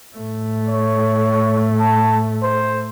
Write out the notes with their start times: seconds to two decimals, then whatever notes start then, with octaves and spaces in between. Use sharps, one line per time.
0.15 A2 A3
0.68 C#5
1.80 A5
2.43 C5